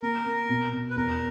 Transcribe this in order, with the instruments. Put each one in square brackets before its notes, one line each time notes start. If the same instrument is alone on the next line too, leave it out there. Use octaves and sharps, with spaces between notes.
[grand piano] A#3 [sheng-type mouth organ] A#4
[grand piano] A#3
B2
B2
[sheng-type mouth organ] B4
[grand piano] E2 [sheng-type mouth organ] A#4